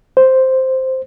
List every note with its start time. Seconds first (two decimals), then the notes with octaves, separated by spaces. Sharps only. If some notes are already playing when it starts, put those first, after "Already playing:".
0.17 C5